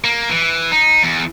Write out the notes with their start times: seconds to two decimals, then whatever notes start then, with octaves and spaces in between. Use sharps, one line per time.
0.04 A#3
0.30 E3
0.72 D#4
1.03 E2